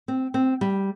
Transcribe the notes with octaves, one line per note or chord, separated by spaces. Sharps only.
C4
C4
G3